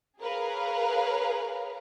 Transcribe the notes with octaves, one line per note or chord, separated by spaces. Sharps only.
G#4 A#4 B4 C#5 F5 A#5